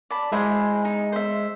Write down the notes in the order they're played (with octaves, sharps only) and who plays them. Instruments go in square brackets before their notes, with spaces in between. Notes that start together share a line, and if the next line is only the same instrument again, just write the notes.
[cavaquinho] D5 A5 B5
[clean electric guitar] G#3 [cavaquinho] E4 G#4 C5
[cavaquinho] D#4
C5 E5